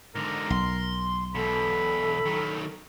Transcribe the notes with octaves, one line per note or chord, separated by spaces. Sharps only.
G#2 D3 A#4
B1 C6
E2 B2 A4 B5
D#3 F#3